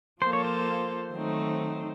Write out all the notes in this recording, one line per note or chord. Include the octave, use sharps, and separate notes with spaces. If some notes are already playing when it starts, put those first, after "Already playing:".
F3 A#3 F4 A4 C5
C#5
C5
D#3 F#3 A3 C4 D#4